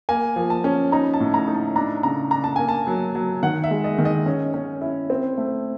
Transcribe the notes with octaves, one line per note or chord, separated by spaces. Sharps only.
A#3 G#5
F3
A5
C#4
D#4 A#5
A5
A2
A#5
D#4
A5
D4 A#5
C#3 A#5
D4 A#5
A5
A#3 G#5
A5
F#3
F#3
D#3 F#5
E5
G#3
D#5
D#3
D#5
C#4
C#4
E4
C4
A3